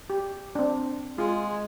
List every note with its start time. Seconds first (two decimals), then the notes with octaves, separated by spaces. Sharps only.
0.10 G4
0.55 C4 D4
1.18 G#3 F4